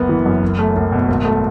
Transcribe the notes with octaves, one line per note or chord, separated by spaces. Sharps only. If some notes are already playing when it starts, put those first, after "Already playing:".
Already playing: F#1 B3
E3
F#2
F#1
A3
F#1
B2
G#1
A3